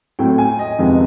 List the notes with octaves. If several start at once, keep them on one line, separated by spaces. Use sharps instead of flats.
A2 F#3 A3 C4 G5
G#5
D#5
F2 C3 D#3 G#3 B3